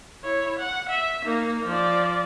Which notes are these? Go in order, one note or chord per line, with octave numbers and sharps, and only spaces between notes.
E4 C#5
F#5
E5
A#3 D#4
F3 D5